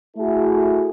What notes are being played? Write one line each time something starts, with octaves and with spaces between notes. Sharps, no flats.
A3 E4 F#4 G#4 A4